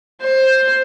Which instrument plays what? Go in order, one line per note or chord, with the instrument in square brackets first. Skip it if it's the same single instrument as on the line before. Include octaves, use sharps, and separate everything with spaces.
[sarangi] C5